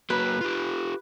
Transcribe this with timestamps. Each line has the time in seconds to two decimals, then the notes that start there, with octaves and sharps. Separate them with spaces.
0.10 F#3 A#3 F#4 B4
0.41 F4 G4